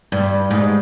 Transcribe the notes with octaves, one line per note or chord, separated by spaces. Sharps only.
G2
G#2